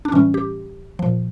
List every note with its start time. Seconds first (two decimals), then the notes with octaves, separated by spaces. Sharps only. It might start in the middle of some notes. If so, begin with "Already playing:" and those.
0.05 D4
0.12 A2 E3 G3 C#4
0.34 G4
0.99 A#2 F3